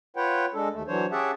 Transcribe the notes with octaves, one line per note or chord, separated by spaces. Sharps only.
F4 B4 C#5 F#5 G5
G#3 D4 A4
D#2 A3
E3 F#3 D4 C5 C#5
C#4 G4 G#4 E5 F#5 A5